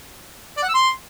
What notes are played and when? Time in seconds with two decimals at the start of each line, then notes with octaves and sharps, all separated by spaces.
0.57 D5
0.63 F#5
0.69 E6
0.74 C6